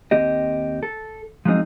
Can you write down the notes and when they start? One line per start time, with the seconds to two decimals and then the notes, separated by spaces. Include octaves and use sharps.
0.11 D#2 C4 G4 D#5
0.83 A4
1.45 F3 F#3 G#3 C4 D#4